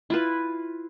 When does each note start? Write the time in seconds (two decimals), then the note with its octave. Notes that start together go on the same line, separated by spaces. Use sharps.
0.10 E4 F4 B4